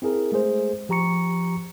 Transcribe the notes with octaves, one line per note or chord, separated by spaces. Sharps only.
C4 E4 G#4 A#4
G#3 A3 G#4 C5
F3 G4 A#5 C#6 C#7